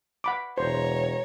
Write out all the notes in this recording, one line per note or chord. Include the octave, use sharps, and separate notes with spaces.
F#5 B5 D6
E1 C5 C#5 A#5